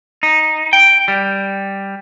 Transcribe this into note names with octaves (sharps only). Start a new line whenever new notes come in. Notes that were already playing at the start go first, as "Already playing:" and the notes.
D#4
G5
G3